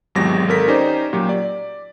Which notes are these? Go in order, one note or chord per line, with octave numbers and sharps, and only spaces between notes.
G#1 E2 F#3 G#3 G4 A#6
G#1 A4 A#4 B6
C#4 D#4 G4 C5 D5
A#2 F#3 G4
D5